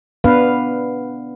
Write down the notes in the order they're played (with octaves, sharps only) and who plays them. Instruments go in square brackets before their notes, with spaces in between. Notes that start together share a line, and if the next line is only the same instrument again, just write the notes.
[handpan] B3 D4 B4 F5